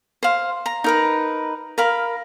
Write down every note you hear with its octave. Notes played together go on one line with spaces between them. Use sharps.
C5 F5
A#5
D#4 A#4 B4
A#4 F5 B5